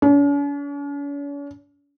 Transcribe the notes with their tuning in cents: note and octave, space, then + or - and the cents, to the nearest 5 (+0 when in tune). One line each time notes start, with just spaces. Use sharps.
C#4 +45